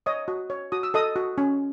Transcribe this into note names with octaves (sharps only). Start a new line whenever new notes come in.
C#5 D#5 D#6
F#4
C#5
F#4 D#6
E6
A4 D#5 D#6
F#4
C#4